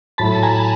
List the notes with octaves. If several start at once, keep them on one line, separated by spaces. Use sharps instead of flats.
A2 F#3 A3 A5 B5
G#5 A#5